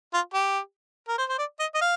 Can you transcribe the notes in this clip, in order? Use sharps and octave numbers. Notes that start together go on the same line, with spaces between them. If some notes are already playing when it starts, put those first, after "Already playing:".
F4
G4
A#4
C5
C5
D5
D#5
D#5
F5